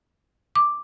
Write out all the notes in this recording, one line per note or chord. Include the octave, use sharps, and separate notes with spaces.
D6